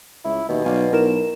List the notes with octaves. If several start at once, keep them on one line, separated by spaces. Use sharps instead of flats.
C#2 E4
D#2 B2
B1 D5 F5 G#5
B1 E4 A#4 E7